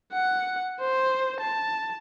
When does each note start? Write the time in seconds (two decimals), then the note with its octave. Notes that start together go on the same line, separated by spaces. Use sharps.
0.12 F#5
0.80 C5
1.41 A5